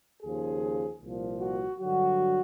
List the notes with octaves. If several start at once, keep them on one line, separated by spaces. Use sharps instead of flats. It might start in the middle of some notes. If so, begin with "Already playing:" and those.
D#2 C#3 F3 G#4
C2 A#2 F3
F#4
G2 D3 F#3 F#4